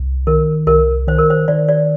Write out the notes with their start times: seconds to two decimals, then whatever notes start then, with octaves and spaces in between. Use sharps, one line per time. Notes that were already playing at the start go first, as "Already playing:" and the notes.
Already playing: C2
0.27 D#3 A#4
0.67 C2 A#4
1.08 D#3 C5
1.18 A#4
1.30 C5
1.48 D#3 D5
1.68 D5